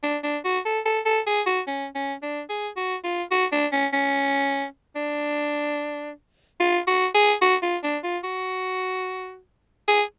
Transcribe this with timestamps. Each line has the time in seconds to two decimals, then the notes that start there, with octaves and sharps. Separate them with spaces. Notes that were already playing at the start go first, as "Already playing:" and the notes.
0.03 D4
0.23 D4
0.44 F#4
0.65 A4
0.85 A4
1.05 A4
1.26 G#4
1.46 F#4
1.67 C#4
1.95 C#4
2.22 D4
2.49 G#4
2.76 F#4
3.04 F4
3.31 F#4
3.52 D4
3.72 C#4
3.93 C#4
4.95 D4
6.60 F4
6.87 F#4
7.14 G#4
7.41 F#4
7.62 F4
7.83 D4
8.03 F4
8.24 F#4
9.88 G#4